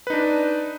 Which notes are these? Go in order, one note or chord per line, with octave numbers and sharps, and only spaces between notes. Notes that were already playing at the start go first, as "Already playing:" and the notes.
D4 D#4 B4